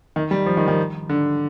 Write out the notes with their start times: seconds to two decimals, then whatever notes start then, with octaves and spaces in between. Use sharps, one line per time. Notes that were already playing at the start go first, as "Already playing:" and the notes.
0.16 D#3
0.31 G3
0.46 F3
0.57 D#3
0.68 D#3
1.09 D3